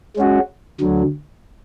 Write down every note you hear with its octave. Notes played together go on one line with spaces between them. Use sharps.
G#3 C#4 F#4
D2 D3 F#3